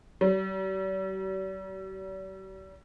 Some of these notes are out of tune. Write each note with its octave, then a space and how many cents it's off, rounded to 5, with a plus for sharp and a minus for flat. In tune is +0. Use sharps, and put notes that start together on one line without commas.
G3 -45